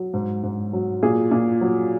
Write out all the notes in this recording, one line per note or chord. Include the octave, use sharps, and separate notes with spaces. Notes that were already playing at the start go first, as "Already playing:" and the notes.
Already playing: F#3
G#2
G#2
F#3
A#2 G#4
A#2
F#3